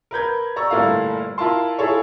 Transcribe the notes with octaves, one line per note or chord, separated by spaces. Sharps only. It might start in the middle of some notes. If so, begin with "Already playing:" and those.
A#4 B4 G6 G#6
D5 A#5 C#6 E6
G1 A#2 A3 E4 F5 A#5
E4 F4 A#4 A5 C6
E4 F4 G#4 A4 C#5